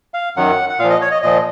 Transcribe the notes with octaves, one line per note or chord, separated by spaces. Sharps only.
F5
F#2 D#3 F#3 F#5
F#5
A#2 F3 F5
D#5
C#5
D#5
A#2 F3 D#5